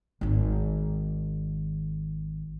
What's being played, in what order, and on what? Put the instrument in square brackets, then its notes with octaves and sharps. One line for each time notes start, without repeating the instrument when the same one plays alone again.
[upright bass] G#1 D#3